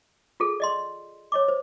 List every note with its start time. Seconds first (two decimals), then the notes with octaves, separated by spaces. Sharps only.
0.40 F4 G#4 A4
0.60 D5 D#5 C6
1.32 C#5 D#5 D6
1.48 C5